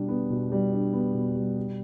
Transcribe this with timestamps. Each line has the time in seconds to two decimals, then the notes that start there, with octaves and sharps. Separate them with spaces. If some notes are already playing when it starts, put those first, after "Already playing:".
Already playing: B2 G3 D4
0.08 B3
0.30 B2
0.52 G3
0.72 D4
0.93 B3
1.14 B2
1.35 G3
1.57 G4